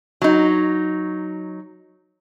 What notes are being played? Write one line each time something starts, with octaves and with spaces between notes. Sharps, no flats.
F#3 D#4